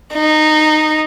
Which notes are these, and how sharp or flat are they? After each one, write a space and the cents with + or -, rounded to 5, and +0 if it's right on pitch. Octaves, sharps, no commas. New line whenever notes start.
D#4 -15